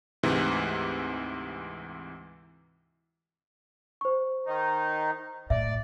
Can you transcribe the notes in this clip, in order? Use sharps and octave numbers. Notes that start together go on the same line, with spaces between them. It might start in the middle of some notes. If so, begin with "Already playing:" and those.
D2 G#2 C3 E3
C5 C#6
D#3 D#4
A2 D5 E5